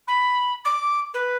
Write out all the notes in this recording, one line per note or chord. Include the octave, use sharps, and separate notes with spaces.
B5
D6
B4